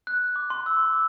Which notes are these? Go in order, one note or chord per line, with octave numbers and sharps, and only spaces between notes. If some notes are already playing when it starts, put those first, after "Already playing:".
F#6
D6
C6
E6
C6
D6